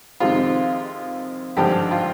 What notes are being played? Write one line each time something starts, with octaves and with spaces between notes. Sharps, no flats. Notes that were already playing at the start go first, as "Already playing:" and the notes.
F2 C3 D#3 G#3 C4 F4
G#1 G2 D3 F3 G4
F4